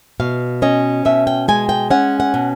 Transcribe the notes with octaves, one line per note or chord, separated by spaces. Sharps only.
B2 F5
C#4 D#5
B2 E5
G5
G#3 G#5
G5
C#4 F#5
F#5
B2